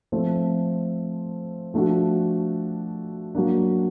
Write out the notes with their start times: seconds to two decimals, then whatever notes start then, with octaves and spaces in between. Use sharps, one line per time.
0.12 F3 A3 C4
1.74 F3 A3 D4 F#4
3.35 F#3 A#3 D4